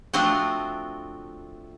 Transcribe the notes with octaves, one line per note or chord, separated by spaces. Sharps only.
F3 A3 C4 D4 F4 F#4